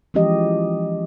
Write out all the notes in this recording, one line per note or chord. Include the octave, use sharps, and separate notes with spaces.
E3 F3 G#3 C#4 G4 D#5